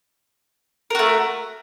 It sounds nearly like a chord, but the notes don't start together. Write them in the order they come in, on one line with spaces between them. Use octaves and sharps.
A#4 F#4 A3